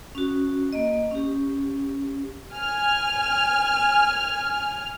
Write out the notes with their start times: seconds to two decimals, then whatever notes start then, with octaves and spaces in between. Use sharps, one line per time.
0.15 C#4 F#4
0.73 A#3 D#5
1.11 C#4 G4
2.54 G#5 F6